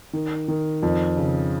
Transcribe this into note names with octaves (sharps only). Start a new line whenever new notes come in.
D#3
D#3
F2
C#3